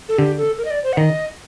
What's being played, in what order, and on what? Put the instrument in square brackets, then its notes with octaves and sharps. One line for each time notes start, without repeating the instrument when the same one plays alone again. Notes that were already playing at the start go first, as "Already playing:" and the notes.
[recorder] A4
[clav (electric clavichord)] D3 [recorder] G4
[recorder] A4
A#4
D#5
D5
C5
F#5
[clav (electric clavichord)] D#3 [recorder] D#5